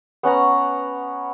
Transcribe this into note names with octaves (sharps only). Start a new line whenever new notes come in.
B3 C#4 F#5 A#5